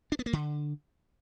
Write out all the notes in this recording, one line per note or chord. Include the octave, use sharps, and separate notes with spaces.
D4
B3
A#3
D3